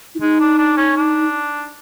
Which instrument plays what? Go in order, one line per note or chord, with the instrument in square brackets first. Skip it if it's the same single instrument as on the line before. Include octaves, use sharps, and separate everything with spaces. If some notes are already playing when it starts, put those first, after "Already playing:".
[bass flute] E4
[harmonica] G#3 [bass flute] D#4
[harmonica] D4
D4
C#4
D4